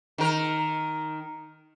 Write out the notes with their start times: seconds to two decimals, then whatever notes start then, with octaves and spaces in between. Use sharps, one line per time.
0.18 D#3 A#4